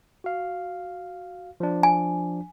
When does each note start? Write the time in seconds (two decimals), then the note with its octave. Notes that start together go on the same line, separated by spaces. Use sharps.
0.24 F#4 F5
1.60 F3 D4
1.83 G#5